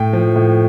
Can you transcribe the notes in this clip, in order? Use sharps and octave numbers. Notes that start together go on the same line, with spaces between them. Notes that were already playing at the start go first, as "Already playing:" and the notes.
Already playing: A2 G5
F3
A2